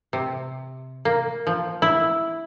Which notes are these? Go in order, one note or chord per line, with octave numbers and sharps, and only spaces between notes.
C3
A#3
F3
E4